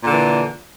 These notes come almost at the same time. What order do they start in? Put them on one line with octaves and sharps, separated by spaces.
A#2 D3 E3